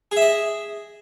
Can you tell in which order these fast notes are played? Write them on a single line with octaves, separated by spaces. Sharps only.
G#4 E5 D#5